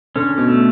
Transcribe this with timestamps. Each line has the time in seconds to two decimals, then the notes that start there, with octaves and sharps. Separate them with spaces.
0.16 D3 C#4
0.38 B2
0.48 A3